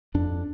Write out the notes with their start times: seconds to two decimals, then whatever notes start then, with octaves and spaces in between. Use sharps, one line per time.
0.14 F2 D4